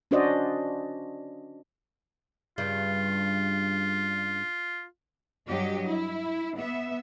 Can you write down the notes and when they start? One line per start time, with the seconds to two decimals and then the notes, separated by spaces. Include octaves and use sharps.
0.11 C#4 D4 F#4 C5 D5 D#5
2.58 G2 C#3 F4
5.47 G2 F#3 G4 D#5
5.87 E4
6.58 B3 E5